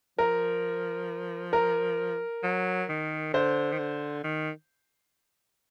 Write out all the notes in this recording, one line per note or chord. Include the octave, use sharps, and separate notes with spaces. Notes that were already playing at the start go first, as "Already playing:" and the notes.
F3 A#4
A#4
F#3
D#3
D3 C5
D#3
D3
D#3